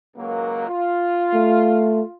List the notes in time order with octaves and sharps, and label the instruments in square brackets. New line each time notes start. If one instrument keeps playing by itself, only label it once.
[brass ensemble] C#2 F#3 A#3
F4
[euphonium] A3